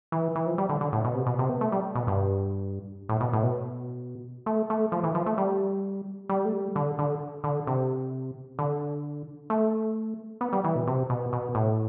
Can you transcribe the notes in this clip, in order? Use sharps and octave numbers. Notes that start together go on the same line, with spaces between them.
E3
E3
F3
G3
D3
D3
A2
B2
C3
B2
C3
B3
A3
G3
B2
G2
A2
B2
A2
B2
A3
A3
F3
E3
F3
A3
G3
G3
A3
G3
D3
D3
D3
C3
D3
A3
B3
G3
E3
B2
C3
B2
B2
A2